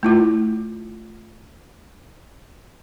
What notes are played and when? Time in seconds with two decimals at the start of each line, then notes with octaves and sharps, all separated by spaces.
0.03 A3 E4 F4